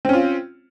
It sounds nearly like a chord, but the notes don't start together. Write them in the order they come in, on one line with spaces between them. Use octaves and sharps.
C4 C#4 F4